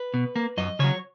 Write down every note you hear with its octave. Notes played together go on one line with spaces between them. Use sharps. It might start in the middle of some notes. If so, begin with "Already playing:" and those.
Already playing: B4
B2
A#3
F#2 D#5
C#3 F#3 C#5